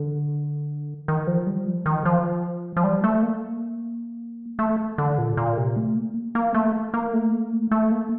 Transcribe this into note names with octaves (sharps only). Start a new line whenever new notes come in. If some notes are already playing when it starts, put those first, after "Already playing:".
Already playing: D3
D#3
F3
G3
F3
D#3
F3
F3
G3
A3
A#3
A3
D3
A#2
A#2
C3
A3
A#3
A#3
A3
A#3
A3
A#3
A3
A3
A#3